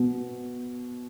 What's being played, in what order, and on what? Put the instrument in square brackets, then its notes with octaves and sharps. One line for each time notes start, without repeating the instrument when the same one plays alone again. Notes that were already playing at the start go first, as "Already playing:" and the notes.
Already playing: [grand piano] B2